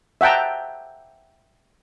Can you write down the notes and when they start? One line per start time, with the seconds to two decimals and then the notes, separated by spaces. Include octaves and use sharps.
0.21 E5 F#5 G5 A5 A#5